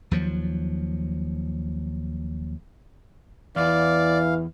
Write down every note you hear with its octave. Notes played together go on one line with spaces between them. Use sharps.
D#2 F3 F#3
E2 E3 D5 F5